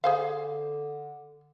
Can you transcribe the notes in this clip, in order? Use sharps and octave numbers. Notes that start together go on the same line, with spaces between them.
D3 G#4 C5 F5